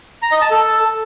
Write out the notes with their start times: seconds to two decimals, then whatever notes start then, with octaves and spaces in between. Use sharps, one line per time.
0.22 A#5
0.32 D#5
0.41 A5
0.51 A4